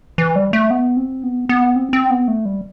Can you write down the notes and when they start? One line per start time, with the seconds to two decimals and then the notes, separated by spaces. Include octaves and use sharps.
0.18 E3
0.36 G3
0.53 A3
0.70 B3
0.97 C4
1.23 B3
1.49 B3
1.76 C4
1.93 C4
2.10 B3
2.28 A3
2.45 G3